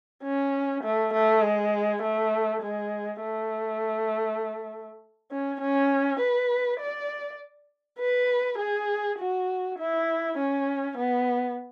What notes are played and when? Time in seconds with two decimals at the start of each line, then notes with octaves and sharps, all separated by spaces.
0.24 C#4
0.83 A3
1.13 A3
1.43 G#3
2.02 A3
2.62 G#3
3.22 A3
5.31 C#4
5.61 C#4
6.20 B4
6.80 D5
7.99 B4
8.59 G#4
9.19 F#4
9.78 E4
10.38 C#4
10.97 B3